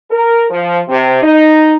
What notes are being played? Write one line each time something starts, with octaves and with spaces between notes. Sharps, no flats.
A#4
F3
C3
D#4